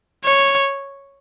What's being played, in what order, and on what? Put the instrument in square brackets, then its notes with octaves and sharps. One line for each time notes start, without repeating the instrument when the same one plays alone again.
[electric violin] C#5